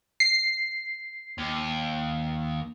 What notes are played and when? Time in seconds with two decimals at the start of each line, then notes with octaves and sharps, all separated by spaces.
0.20 C7
1.38 D#2